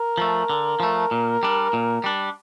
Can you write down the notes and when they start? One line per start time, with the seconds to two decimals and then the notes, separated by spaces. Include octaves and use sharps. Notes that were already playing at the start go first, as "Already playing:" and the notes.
Already playing: A#4
0.18 F3 A3
0.50 D3
0.80 F3 A3
1.11 A#2
1.43 G3 D4
1.73 A#2
2.04 G3 D4